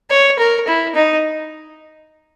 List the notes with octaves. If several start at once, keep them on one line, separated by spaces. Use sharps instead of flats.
C#5
A#4
E4
D#4